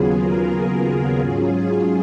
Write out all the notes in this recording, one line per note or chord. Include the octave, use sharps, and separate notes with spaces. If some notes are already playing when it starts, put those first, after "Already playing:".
Already playing: D#2 C#3 F#3 B3 F4 G#4
A#4
G#2 F#3 C#4 F4 G#4
G#4